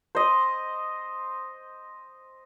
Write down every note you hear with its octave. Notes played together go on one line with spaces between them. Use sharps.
C5 D#5